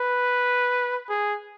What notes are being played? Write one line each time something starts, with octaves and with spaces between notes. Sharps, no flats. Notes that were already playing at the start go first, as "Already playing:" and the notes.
Already playing: B4
G#4